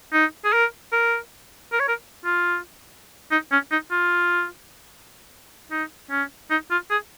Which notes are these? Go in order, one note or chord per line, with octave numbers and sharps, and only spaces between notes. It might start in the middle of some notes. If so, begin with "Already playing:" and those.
D#4
G#4
A#4
A#4
A#4
C#5
A#4
F4
D#4
C#4
D#4
F4
D#4
C#4
D#4
F4
G#4